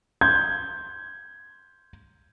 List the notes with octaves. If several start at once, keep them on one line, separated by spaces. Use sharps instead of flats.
C6 G6 G#6